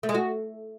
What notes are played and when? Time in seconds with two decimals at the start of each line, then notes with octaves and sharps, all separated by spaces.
0.03 A3
0.09 G#3
0.15 F#4